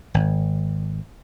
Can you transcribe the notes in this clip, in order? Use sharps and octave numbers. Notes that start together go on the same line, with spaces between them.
G#1